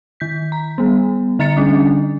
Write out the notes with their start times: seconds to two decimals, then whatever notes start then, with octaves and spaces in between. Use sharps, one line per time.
0.20 D#3 G6 B6
0.52 A#5
0.78 G3 B3
1.39 D3 E5 A#5 A6 C#7
1.57 D3 G3 C#4 D4